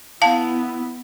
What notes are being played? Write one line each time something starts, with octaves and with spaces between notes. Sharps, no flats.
B3 E4 F5 A5